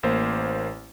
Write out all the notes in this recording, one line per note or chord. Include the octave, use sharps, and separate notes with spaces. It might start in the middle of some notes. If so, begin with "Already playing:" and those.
A1 A#3 C5